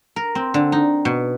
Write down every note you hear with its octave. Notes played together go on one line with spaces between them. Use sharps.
A#4
C4
D3
D#4
B2